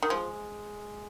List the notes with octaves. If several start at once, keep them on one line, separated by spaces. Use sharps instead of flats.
D#3
F3 G#3